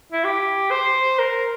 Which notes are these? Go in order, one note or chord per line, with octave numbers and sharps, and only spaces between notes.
E4
G4
C5
A#4